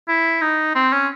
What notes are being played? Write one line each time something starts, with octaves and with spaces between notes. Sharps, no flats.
E4
D#4
C4
C#4